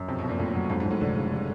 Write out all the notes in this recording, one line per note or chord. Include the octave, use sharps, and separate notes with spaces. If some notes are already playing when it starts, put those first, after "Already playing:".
Already playing: F#2
F2 C3
B2
F2
A#2
F2 A2
F#3
F2 G#2
G#2
F2 A2
F1 D3
C#3
G3